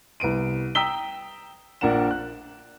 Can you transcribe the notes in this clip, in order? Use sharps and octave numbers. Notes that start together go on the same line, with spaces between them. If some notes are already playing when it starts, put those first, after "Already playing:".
C2 B3 D7 D#7
G5 A#5 D#6 E6 B6 G7
A#1 D4 A#4 F#5 E7
F#6